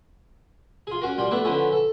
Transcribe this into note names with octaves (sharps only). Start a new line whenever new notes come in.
F4 G#4
C#4 F#4 A#4
G3 F4 G4
A3 B3 D4 E4
D3 F3 B3 C#4 E4
A4